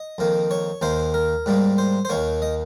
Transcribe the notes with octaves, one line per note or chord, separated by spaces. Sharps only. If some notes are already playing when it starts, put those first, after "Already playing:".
Already playing: D#5
F2 D#3 A#3
C#5
D#2 D#3 A#3 C5
A#4
G#2 G3 A#3
C5
C5
D#2 D#3 A#3 C#5
D#5